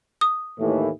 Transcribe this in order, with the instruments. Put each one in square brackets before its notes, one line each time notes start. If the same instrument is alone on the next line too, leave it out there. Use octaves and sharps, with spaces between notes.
[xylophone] D#6
[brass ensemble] D#2 A2 E3